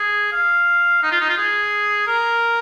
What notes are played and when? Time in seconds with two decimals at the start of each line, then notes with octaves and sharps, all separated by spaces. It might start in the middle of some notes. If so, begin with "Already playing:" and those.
Already playing: G#4
0.33 F5
1.03 D#4
1.12 F4
1.21 D#4
1.29 F4
1.38 G#4
2.07 A#4